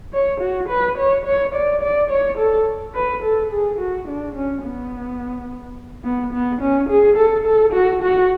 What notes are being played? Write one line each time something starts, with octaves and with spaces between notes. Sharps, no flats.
C#5
F#4
B4
C#5
C#5
D5
D5
C#5
A4
B4
A4
G#4
F#4
D4
C#4
B3
B3
B3
C#4
G#4
A4
A4
F#4
F#4